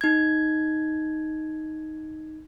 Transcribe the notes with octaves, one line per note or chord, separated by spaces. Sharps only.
D#4 G#6